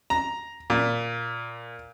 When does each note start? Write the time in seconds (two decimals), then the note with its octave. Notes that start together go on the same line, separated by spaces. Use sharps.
0.10 A#5
0.70 A#2